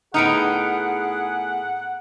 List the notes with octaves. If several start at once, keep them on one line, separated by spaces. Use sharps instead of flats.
A2 B3 D#4 G#4 F#5 F6 C#7 D7